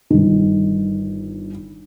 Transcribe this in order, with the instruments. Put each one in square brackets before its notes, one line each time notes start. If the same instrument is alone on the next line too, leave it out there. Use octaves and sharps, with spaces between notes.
[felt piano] G1 D#3